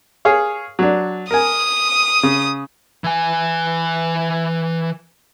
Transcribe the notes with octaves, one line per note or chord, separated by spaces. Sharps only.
G#4 C#5 F5
F#3 D4
A#4 G#5 D#6
C#3
E3 G#5